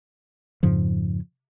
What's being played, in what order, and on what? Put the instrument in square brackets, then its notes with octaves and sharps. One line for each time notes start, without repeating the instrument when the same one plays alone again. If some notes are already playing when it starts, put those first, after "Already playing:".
[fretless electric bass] F2 G#2 C#3 F3